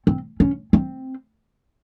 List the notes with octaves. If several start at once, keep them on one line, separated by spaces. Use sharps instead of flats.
C4
C#4
C4